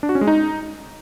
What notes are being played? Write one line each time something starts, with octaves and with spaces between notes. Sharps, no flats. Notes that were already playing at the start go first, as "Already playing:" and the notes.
D4
F#4
C#4
G#3
D#4